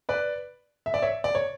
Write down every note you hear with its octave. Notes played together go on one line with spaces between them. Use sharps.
B4 D5
E5
D5
C#5 E5
D5
C#5